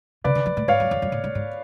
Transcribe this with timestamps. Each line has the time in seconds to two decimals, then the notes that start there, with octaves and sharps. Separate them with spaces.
0.24 C#3 B4 D5
0.35 D3
0.46 F3
0.57 A2
0.68 G#2 C#5 F5
0.80 F#2
0.91 F2
1.02 F#2
1.12 A2
1.24 G#2
1.35 G#2